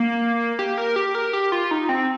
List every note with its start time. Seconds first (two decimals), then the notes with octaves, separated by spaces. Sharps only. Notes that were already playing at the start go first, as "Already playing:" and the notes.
Already playing: A#3
0.59 G4
0.78 A#4
0.96 G4
1.15 A#4
1.33 G4
1.52 F4
1.71 D#4
1.89 C4